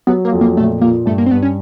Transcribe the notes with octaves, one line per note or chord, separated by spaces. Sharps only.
F#3 B3
A#3
F2
A#3
A#2 A3
A#2 A#3
G2 A3
A#3
C4
G2 B3
C#4